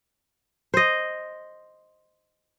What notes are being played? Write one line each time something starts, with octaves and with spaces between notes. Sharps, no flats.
C5 D#5